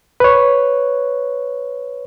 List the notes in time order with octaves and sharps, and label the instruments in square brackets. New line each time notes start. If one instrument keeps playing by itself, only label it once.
[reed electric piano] B4 C#5